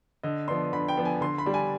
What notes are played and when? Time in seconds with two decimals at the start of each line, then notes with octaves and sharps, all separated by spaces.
0.23 D3 D#5
0.48 F3 B3 D4 C6
0.73 D3 B5
0.88 G5
0.97 F3 B3 D4
1.05 G#5
1.21 D3 C6
1.38 B5
1.46 G3 D4
1.54 G#5